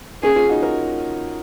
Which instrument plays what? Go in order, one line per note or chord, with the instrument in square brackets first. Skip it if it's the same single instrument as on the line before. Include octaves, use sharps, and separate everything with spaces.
[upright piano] A#3 C#4 [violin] G#4
[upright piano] C#4 F4
D#4 F#4
F#4 A#4